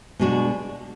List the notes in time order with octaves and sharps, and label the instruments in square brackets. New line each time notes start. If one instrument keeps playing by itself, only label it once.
[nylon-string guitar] B2 G#3 D4 F#4